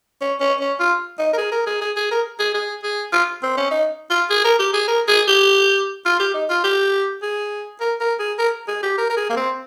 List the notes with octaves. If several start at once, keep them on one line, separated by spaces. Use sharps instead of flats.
C#4
C#4
C#4
F4
D#4
A#4
G#4
A#4
G#4
G#4
G#4
A#4
G#4
G#4
G#4
F4
C4
C#4
D#4
F4
G#4
A#4
G4
G#4
A#4
G#4
G4
F4
G4
D#4
F4
G4
G#4
A#4
A#4
G#4
A#4
G#4
G4
A#4
A#4
G#4
A#3
C4